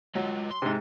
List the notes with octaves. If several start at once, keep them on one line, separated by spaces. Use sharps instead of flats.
F#3 G#3 F4
C6
G#2 C3